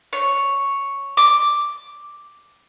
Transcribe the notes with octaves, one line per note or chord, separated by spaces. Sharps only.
C#5
D6